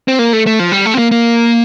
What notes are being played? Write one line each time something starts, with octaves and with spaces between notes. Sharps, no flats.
C4
A#3
A3
A3
F3
G3
A3
C4
A#3
A#3